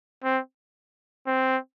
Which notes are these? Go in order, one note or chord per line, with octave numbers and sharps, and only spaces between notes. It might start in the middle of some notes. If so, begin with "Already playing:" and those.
C4
C4